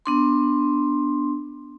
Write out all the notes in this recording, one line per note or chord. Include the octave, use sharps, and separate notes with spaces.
B3 D4 C6